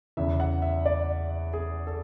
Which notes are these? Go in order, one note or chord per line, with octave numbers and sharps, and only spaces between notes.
E2 C#3 E3 E5
F#5
E5
D5
G#4
A4